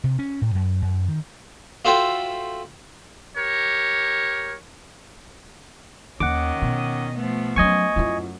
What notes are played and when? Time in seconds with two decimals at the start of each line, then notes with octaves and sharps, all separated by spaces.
0.04 C3
0.19 C#4
0.41 A2
0.55 F#2
0.82 F#2
1.08 D#3
1.85 F4 F#4 A4 C5 E5 G5
3.37 G4 A#4 C#5
6.20 D#2 D#3 C#4 D#5 F#5 D6
6.62 B2
7.15 F3 A3 B3
7.56 F#3 C#4 D#5 G#5 C#6
7.96 F#2 E4 F4